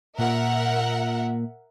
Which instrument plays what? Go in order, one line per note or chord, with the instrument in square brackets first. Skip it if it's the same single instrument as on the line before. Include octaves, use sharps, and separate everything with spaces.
[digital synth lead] A#2 [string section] A#4 E5 F#5